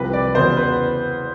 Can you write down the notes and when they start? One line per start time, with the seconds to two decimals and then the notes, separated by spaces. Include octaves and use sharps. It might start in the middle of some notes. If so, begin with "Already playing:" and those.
Already playing: C2 C3 F3 B4
0.13 D5
0.35 E2 C#3 F#3 B3 C5
0.57 B4